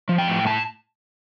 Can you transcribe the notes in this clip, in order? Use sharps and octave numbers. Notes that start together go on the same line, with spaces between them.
F3
G5
A2
A5